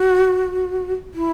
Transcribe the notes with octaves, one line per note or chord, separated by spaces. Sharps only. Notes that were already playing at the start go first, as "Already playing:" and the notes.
Already playing: F#4
E4